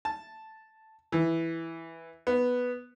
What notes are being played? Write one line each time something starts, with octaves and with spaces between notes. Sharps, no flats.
A5
E3
B3